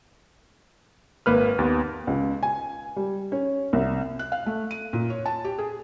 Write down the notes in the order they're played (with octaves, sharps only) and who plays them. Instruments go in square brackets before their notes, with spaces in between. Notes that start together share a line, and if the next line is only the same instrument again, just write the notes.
[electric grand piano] G#1 A#3 B4 F6
D#2 B3
[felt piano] C#2
G#5
G3
C#4
C2
F#6
F5
A3
D#7
A#2
C#5
A5
G4
G#4